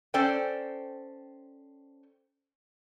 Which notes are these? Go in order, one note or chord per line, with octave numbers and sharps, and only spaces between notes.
C#4 A4 C5 D5 G5